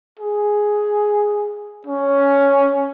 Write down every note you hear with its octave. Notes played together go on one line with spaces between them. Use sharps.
G#4
C#4